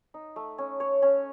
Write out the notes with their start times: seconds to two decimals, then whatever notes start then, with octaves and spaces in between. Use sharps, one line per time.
0.14 D#4
0.36 A3
0.58 C#4
0.80 C#5
1.02 C#4